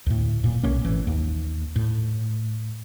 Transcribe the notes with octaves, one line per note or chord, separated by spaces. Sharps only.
D2 A2
D1 A#2
B1 A#3 C#4
G#1 E3
D#2
A2